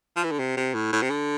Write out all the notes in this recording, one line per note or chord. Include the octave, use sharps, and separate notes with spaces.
F3
E3
D3
C3
C3
A2
A2
C3
D3